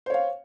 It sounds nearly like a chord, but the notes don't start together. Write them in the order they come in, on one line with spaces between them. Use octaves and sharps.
C5 C#5 F5